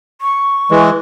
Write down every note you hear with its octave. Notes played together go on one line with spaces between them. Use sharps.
C#6
E3 G#3